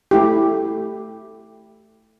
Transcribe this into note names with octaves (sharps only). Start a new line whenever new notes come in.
A3 E4 G4